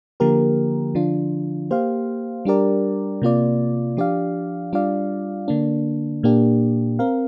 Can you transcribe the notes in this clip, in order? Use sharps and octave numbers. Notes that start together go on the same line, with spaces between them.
D3 F3 A#3 G4 A#4
D3 F3 D4 F4
A#3 G4 C5 F5
G3 D4 G4 A#4 D5
C3 A#3 F4 D5
F3 D4 G4 D5 F5
G3 D4 F4 D5 F5
D3 A#3 D4
A#2 A#3 D4 G4
C4 A#4 F5